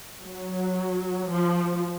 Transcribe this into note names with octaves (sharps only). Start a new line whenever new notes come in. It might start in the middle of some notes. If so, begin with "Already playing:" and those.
F#3
F3